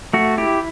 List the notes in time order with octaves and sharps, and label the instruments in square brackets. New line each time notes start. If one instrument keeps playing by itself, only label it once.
[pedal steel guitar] A3 F#4
E4 G4